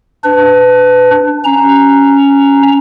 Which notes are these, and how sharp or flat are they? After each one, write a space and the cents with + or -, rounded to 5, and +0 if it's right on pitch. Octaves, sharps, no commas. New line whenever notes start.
D4 +0 B4 +25
C#4 +0 A#5 +0